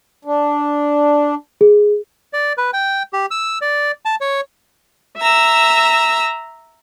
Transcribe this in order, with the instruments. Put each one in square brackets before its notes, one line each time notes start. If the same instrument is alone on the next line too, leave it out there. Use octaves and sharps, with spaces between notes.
[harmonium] D4
[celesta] G#4
[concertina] D5
B4
G5
G4
E6
D5
A5
C#5
[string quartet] E5 A#5 E6